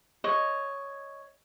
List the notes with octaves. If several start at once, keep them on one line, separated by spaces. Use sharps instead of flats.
C#5 D#5